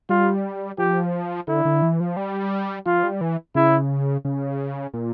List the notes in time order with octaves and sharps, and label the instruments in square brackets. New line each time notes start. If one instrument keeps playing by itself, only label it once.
[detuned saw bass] G3 [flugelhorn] F4
[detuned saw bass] F3 [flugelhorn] G4
[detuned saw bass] D3 [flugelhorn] E4
[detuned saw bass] D3
E3
F3
G3
[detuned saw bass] F3 [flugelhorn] F4
[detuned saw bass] G3
E3
[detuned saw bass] C#3 [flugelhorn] E4
[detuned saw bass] C#3
A#2